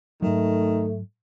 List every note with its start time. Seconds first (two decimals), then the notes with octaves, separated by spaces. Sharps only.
0.22 G#2 D#3 F#3 A3